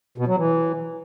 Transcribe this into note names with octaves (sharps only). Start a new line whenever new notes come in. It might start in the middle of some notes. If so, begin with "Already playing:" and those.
B2
F#3
E3